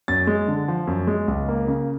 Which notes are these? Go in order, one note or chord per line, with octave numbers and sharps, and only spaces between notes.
F#2 A6
G#3
D3
F3
F#2
G#3
C#2
A#3
C#3